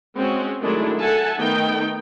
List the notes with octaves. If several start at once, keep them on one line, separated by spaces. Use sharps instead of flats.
G#3 C4 C#4 F#4
D#3 F#3 G#3 A3 D4 E4
A4 E5 F#5 G#5 A5
D#3 A3 B3 D#4 G5